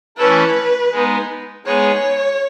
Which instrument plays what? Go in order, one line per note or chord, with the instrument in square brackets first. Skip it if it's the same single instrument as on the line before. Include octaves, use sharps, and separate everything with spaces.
[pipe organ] E3 A3 C#4 E4 A4 [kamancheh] B4
[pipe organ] G#3 B3 D#4
[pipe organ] G#3 B3 D#4 G#4 [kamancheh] C#5